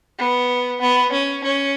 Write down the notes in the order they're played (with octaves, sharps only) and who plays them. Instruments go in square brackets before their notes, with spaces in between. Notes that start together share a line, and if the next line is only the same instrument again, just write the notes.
[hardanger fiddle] B3
B3
C#4
C#4